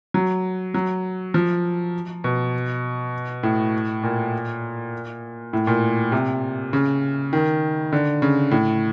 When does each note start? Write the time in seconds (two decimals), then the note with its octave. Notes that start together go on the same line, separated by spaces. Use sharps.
0.14 F#3
0.74 F#3
1.34 F3
2.24 B2
3.43 A2
4.03 A#2
5.53 A2
5.67 A#2
6.12 C3
6.73 C#3
7.33 D#3
7.92 D3
8.22 C#3
8.51 A2